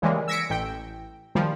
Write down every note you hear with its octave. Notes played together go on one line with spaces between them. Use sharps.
C#3 E3 G3 G#3 A#3
E6 G#6 A#6 B6 C#7 D7
A1 G5
D#3 F3 G3